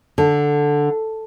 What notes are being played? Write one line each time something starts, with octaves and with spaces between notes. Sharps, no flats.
D3